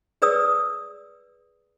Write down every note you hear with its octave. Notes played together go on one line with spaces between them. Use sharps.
G#4 B4 D5 D#6 E6